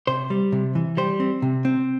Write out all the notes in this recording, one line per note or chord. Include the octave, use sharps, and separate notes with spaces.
C3 C5
G3
C3
E3
G3 C5
C4
C3
C4